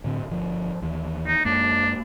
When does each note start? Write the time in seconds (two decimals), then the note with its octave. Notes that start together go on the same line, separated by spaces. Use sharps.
0.04 A2 D3 C4
0.29 G1 F3
0.82 D#2 E3
1.27 D#4
1.45 F#2 G#3 A#3 D4